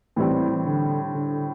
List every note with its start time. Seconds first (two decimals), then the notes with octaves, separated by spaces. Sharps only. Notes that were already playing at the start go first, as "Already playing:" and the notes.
0.16 A2 E3 G3 C4
0.65 D3
1.14 D3